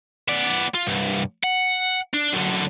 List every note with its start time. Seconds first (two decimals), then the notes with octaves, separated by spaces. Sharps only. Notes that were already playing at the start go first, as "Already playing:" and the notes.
0.28 B3 D5
0.74 F4
0.87 C2 G2
1.44 F#5
2.14 D4
2.33 F#2 D3